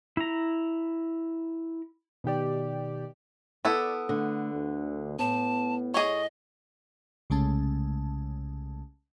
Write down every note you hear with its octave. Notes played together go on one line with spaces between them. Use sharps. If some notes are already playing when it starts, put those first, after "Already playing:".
E4 A#5
B2 D#3 G4 D5
B3 E4 A4 D5
D3 A3
D2
A2 B3 A5
G#4 C#5 D#5
C2 C#3 G#3 A3 C#4 A5